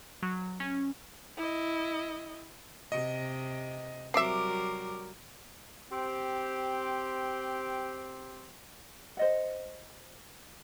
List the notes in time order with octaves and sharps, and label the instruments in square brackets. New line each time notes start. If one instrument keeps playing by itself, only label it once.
[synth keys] F#3
C#4
[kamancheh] E4 D#5
[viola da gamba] C3 [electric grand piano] D#5
[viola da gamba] F#3 G3 A#4 [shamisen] C4 E5 [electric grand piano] D6 C7
[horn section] C4 G4
[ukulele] C5 D#5 F#5